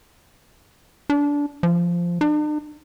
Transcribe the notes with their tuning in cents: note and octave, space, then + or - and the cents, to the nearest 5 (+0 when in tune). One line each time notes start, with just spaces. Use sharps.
D4 -20
F3 -10
D4 +45